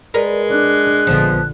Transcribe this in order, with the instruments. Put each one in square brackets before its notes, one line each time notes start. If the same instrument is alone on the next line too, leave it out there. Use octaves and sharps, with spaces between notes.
[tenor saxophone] G#3 [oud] A#4 B4 [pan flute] D5
[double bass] D4 [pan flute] F#6
[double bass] A#1 D3 [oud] F3 B3